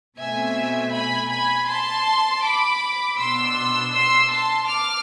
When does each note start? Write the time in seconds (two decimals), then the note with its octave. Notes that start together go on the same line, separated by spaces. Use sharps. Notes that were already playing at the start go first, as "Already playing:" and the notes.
0.19 B2 A3 C4 E5 G#5
0.93 G#5 B5
1.31 G#5 B5
1.68 A5 C6
2.43 B5 D6
3.18 B2 B3 D4 C6 E6
3.93 C6 E6
4.31 A5 C6
4.68 D6 F6